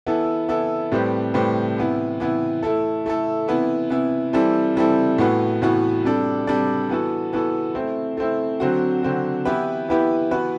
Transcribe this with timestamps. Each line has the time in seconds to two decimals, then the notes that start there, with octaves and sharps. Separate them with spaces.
0.06 E3 B3 E4 A4
0.49 E3 B3 E4 A4
0.92 A2 G3 C4 G4 B4
1.34 A2 G3 C4 G4 B4
1.76 C3 E3 B3 E4
2.20 C3 E3 B3 E4
2.63 A3 E4 A4
3.06 A3 E4 A4
3.48 C3 E3 B3 E4
3.90 C3 E3 B3 E4
4.33 E3 G3 C4 E4 A4
4.76 E3 G3 C4 E4 A4
5.18 A2 E3 B3 F#4 B4
5.62 A2 E3 B3 F#4 B4
6.04 C3 G3 D4 A4
6.47 C3 G3 D4 A4
6.89 E3 B3 F#4 A4
7.33 E3 B3 F#4 A4
7.75 A3 C4 E4
8.17 A3 C4 E4
8.60 D3 F#3 C4 F#4
9.03 D3 F#3 C4 F#4
9.45 E3 B3 E4 G4 B4
9.88 E3 B3 E4 G4 B4
10.31 E3 B3 F#4 B4